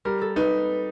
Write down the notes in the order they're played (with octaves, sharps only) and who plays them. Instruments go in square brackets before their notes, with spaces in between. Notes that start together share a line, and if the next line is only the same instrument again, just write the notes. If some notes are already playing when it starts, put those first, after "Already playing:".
[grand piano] G3 [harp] A#4
[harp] A4
[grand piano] D#4 [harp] B4